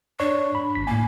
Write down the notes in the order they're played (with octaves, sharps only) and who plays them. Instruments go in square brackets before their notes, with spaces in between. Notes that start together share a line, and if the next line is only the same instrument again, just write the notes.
[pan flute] D4 [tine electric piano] C#5 D5 C#6
[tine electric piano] B5
G#1 B6
[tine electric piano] A2 G#5 [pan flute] A#3